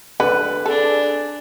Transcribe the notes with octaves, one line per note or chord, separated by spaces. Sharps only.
D3 B4
D4 G#4 A4